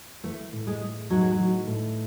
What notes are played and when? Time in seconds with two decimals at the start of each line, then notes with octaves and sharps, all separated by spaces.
0.23 E3 A3
0.53 A2
0.67 G#3
0.81 A3
1.10 F#3 D#4
1.21 G#3
1.32 F#3
1.39 E3
1.67 A2